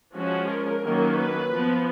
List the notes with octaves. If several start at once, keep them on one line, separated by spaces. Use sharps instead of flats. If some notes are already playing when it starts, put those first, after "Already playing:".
F3 G#3 C#4 F#4
A#4
D#3 F#3 A#3 C#4
B4
F3 B3